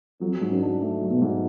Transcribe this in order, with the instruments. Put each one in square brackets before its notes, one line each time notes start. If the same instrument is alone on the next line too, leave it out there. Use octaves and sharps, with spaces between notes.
[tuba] F2 [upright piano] F#3
[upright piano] G#2
[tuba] F#2
[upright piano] D4
A3
F#3
[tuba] B2
[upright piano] G#2